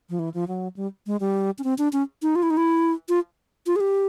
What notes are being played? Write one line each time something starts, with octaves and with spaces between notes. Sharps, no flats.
F3
E3
F3
F#3
G3
G#3
G3
C#4
C4
D4
C#4
D#4
F4
E4
D#4
E4
F4
F4
G#4
G4